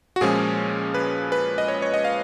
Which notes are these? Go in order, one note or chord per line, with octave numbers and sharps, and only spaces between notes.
F#4
A#2 F3 G#3 C#4 G#4
B4
B4
D#5
C#5
C#5
D#5
F5